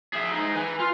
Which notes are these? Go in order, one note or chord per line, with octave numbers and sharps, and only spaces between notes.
G#4 E5
D#4 G#4
B4 G#5
F4